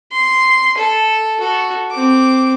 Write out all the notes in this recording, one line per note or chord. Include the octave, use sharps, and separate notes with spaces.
C6
A4
F#4 A4
C4 D6